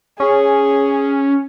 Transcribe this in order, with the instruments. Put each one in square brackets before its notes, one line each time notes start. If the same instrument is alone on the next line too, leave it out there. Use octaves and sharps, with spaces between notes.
[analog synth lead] C#4 [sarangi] G#4